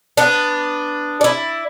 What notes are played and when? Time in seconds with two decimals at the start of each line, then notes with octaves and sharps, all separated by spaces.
0.17 B3 D4
1.21 E4 D5